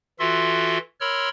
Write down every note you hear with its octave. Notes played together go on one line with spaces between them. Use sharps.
E3 F4 F#4 A4 E5 C6
A#4 C#5 B5 C6 E6 F6